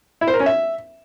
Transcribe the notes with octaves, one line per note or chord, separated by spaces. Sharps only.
E4
C5
A#4
C#4
E5